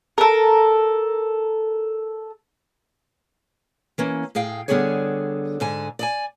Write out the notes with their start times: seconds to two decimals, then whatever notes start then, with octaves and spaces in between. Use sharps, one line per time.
0.18 A4 A#4
3.98 E3 A#3 C#4
4.35 A2 G#4 F5 G5
4.68 D3 G3 B3 G4 G#4 C#5
5.60 G#2 D3 G#5
5.99 D5 D#5 G#5